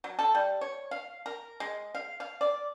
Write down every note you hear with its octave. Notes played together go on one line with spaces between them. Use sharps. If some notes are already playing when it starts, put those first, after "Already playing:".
F#3
A4
G3
C#5
F5
A#4
G#3
F5
F5
D5